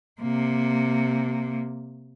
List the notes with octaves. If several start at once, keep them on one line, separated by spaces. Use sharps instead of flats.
C3 A#3